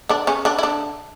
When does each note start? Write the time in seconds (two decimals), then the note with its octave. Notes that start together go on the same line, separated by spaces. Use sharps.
0.09 D3 D4
0.27 C#3 C#4
0.45 D3 D4
0.59 E4
0.63 D3 D4